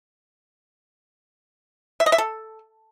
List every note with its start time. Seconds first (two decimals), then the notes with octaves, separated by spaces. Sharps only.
2.00 E5
2.06 D#5
2.12 E5
2.18 A4